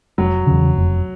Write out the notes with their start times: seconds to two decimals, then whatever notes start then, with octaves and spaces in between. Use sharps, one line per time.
0.18 F1 F#3
0.47 E2 C#3
0.76 F1